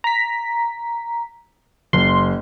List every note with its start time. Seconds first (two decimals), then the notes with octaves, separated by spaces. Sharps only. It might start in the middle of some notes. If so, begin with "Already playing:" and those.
0.04 A#5 B6
1.93 F#1 C6